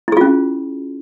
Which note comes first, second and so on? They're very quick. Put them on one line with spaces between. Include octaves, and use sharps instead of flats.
E4 G#4 F4 C#4